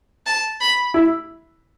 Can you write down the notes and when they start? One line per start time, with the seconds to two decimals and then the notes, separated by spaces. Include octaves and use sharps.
0.26 A5
0.61 B5
0.94 E4